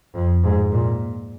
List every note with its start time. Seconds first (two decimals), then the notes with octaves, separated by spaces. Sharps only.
0.15 F2
0.44 G#2
0.72 A#2